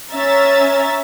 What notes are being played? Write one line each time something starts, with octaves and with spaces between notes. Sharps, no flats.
C#4 E5 A#5 A6